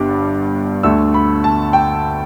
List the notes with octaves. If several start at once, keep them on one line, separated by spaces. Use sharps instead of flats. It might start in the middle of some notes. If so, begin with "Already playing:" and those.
Already playing: G1 G2 G3 D4 D6
D2 D3 A3 E6
B5
A5
G5